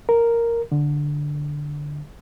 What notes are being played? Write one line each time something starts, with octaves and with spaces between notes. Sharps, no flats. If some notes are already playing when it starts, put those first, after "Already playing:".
A#4
D3